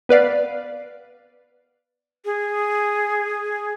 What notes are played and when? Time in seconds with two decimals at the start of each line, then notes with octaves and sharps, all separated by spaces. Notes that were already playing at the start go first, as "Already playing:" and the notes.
0.09 B3 B4 D5 F5
2.25 G#4